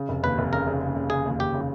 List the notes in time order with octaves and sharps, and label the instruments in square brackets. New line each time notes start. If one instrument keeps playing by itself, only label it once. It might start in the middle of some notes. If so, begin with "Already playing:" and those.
Already playing: [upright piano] C#3
F1
[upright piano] D#2 [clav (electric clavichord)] B4
[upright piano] F1
[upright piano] C#3 [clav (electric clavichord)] A#4
[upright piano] C#3
C#3
C#3
[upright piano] C#3 [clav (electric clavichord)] G#4
[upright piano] D#2
[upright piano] D#2 [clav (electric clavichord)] G4
[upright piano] C#3